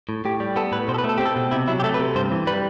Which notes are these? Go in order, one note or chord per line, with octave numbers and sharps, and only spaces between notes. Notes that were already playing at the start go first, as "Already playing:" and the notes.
A2
A2 G4
G3
B3 A4
A2 B4
B2 C5
A4
B4
A3
A4
C4 G4
A4
B2
C3 E4
F#3 E4
G4
A3 A4
B4
C3
G2 C5
E3
G3 B4